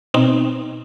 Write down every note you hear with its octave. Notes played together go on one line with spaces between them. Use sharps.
B2 C4 D#4